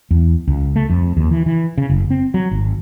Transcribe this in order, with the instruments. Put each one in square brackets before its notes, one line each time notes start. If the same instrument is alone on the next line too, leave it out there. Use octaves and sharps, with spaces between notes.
[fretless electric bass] E2
C#2
A3
F2
D#2
E3
E3
C#3
F#1
C4
F#3
G#1